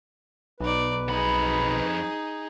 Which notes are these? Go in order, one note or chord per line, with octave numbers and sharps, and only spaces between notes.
B1 D#4 B4 D5
F2 D#4 G#4 B5